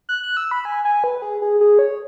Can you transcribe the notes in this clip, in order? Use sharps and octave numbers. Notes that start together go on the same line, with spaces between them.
F#6
F#6
E6
B5
G#5
G#5
B4
G#4
G#4
G#4
C#5